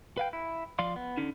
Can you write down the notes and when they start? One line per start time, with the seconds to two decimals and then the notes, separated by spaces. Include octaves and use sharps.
0.17 B4 F5 G5
0.33 E4
0.79 F3 F4 D5 F5 C6
0.96 B3
1.17 D3 C#4 D#4